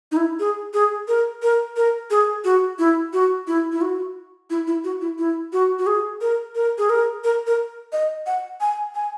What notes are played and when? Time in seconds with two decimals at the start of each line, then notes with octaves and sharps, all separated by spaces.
0.12 D#4
0.17 E4
0.40 G#4
0.74 G#4
1.08 A#4
1.42 A#4
1.76 A#4
2.10 G#4
2.45 F#4
2.79 E4
3.13 F#4
3.47 E4
3.72 E4
3.81 F#4
4.50 E4
4.67 E4
4.84 F#4
5.01 E4
5.19 E4
5.53 F#4
5.79 F#4
5.87 G#4
6.21 A#4
6.55 A#4
6.78 G#4
6.90 A#4
7.24 A#4
7.47 A#4
7.93 D#5
8.27 F#5
8.61 G#5
8.95 G#5